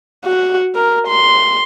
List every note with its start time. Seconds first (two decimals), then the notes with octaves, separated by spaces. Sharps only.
0.25 F#4
0.75 A#4
1.08 C6